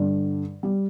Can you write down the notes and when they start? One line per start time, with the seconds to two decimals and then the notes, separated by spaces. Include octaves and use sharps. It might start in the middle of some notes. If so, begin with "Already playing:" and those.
Already playing: G2 D3
0.63 G3